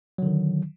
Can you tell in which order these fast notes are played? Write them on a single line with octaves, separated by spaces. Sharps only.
F#3 D3 D#3